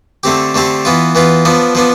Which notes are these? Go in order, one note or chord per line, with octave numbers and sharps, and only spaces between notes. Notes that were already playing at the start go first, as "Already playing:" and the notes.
D3 A3 C4 G4
D3 A3 C4 G4
E3 B3 F4
E3 B3 F4
F3 B3 D4
F3 B3 D4